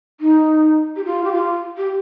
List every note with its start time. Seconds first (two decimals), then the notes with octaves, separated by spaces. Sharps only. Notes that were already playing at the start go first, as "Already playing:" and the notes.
0.20 D#4
0.96 G4
1.05 F4
1.24 G4
1.32 F4
1.77 G4